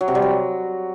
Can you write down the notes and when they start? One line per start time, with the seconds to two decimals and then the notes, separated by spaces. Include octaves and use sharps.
0.01 F#3
0.08 C3
0.15 G3
0.22 F#3